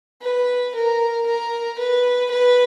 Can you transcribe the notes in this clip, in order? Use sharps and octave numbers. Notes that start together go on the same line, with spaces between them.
B4
A#4
A#4
B4
B4